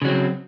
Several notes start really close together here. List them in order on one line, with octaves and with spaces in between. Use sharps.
C#3 F#3 C4